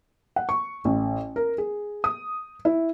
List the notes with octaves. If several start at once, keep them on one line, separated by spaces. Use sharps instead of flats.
F#5
C#6
A1
A#4
G#4
D#6
E4